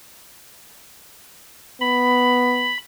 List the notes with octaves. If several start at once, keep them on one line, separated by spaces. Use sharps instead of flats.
B3 B5